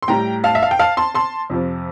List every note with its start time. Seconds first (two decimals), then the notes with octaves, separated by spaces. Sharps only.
0.02 C6
0.08 A2 G3 G5 A#5
0.44 F5 A5
0.55 E5
0.63 F5
0.71 G5
0.79 F5 A5
0.97 A5 C6
1.15 A5 C6
1.50 F2 C3 F3